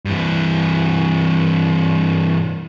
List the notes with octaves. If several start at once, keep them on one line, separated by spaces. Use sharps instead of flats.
G2 E3